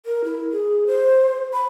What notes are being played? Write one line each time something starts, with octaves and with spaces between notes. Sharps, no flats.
A#4
E4
G#4
C5
B5